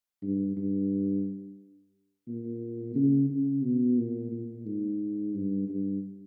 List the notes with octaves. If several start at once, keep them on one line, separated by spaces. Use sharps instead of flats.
G2
G2
A#2
C#3
C#3
B2
A#2
A#2
G#2
G2
G2